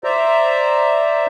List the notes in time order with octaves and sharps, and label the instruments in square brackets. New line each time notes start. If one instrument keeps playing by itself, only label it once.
[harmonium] C5 D5 E5 A#5